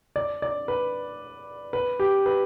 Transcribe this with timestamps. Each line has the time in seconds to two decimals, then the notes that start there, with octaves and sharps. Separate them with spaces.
0.16 D5
0.42 D5
0.68 B4
1.73 B4
1.99 G4
2.26 B4